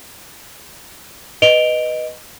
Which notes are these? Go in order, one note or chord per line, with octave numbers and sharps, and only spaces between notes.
B4 D#5 D7 F7 G7